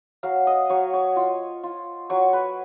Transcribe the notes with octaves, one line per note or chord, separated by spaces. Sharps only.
F#3 F5
D#5
F#3 C#5
C#5
F4
F4
F#3 C#5
B4